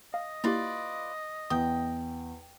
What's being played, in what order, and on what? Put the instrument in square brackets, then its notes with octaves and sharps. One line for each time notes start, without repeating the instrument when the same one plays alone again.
[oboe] D#5 [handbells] F5
[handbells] A#3 E4 G4 [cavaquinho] F4 B4 D5
[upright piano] E2 [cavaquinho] G5 [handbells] D#6 G6